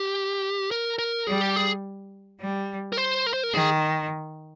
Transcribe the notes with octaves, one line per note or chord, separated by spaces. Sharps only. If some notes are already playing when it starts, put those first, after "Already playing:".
Already playing: G4
A#4
A#4
G3 G#4
G4
G#4
G3
A#4
C5
A#4
C5
A#4
D#3 G#4